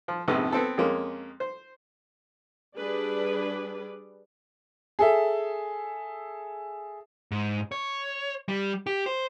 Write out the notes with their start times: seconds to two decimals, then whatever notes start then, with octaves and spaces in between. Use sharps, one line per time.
0.08 F3
0.28 A#1 F2 G#2 C3 F3 B3
0.52 B3 C4 A4
0.78 F2 G#3 A#3 C#4
1.40 C5
2.77 G3 D4 G#4 B4 D5
4.99 G#4 A4 E5
7.31 G#2
7.72 C#5
8.49 G3
8.87 G4
9.06 C5